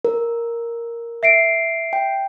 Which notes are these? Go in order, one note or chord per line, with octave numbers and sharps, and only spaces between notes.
A#4
E5 C7 D7
G5